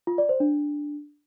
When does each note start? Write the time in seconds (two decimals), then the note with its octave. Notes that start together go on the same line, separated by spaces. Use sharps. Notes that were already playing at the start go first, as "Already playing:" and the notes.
0.07 F4
0.18 D5
0.29 C5
0.40 D4